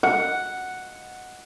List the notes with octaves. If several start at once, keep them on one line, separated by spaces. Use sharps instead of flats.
F#5